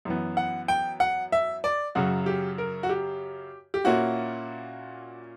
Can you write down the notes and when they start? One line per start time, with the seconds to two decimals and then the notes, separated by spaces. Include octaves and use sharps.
0.05 F#2 E3 B3
0.37 F#5
0.68 G5
1.00 F#5
1.32 E5
1.64 D5
1.95 F#2 C#3 F#3 F#4
2.26 G4
2.58 A#4
2.83 F#4
2.89 G4
3.74 G4
3.84 A#2 A#3 C#4 E4 F#4